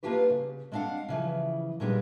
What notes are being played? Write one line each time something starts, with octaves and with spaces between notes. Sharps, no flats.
A#3 B3 D4 F4 G4 B4
C#3
G#3 C4 D4 D#5 F5 F#5
C#3 E3 F3
A#2 D#3 G3 G#3 B3 D4